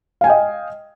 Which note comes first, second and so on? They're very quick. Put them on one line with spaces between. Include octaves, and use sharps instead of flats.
F5 G#5 G5 D#5